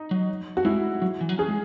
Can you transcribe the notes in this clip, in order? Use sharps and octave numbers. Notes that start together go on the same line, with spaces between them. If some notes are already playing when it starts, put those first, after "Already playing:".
Already playing: D#4
F#3
F#4
G#3 E4
F#3
E3
F#3
C#4 G#4
G#3